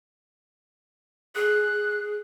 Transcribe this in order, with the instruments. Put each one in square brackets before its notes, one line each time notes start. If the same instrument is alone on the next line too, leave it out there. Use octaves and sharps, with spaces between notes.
[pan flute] G#4 [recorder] F#6